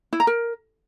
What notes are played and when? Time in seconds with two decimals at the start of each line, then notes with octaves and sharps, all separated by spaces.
0.13 E4
0.20 A#5
0.27 A#4